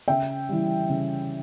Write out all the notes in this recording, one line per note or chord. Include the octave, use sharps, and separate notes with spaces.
C#3 E5 G5
E3 G3
C#3